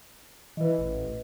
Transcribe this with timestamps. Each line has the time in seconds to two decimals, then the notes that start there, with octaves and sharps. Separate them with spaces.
0.57 E3 B4 D#5
0.79 A1